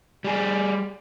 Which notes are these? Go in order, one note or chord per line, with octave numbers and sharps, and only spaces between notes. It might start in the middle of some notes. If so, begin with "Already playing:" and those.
G3 G#4